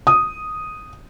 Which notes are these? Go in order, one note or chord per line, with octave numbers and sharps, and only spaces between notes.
D#6